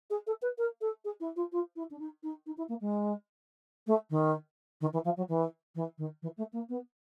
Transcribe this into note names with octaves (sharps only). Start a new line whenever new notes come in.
G#4
A4
B4
A#4
A4
G#4
E4
F4
F4
E4
D4
D#4
D#4
D#4
E4
A#3
G#3
A3
D#3
D#3
E3
F3
F#3
E3
E3
D#3
E3
A3
A#3
B3